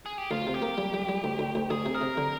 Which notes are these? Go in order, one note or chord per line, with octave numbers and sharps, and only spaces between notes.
G#4
G4
D2 F4
C3
G4
A#3
G3
G3
G3
D2
D2
D2
D2 G#4
C3
A#4
C3
D3